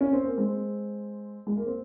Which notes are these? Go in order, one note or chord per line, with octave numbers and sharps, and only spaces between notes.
C#4
C4
A#3
G#3 C4
G#3
A#3
C4